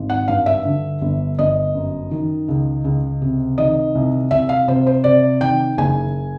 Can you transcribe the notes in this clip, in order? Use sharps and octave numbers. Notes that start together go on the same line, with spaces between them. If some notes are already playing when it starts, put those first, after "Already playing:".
Already playing: G#1
F#5
G2 F5
E5
D3
G1
G1 D#5
F#2
D#3
C#2
C#2
C3
D#3 D#5
C2
C2 E5
F5
C3 C5
C5
C3 D5
D#3 G5
F#1 G#5